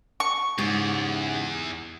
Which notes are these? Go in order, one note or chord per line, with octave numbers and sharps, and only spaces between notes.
C#6
E2 G#2 C#3 G4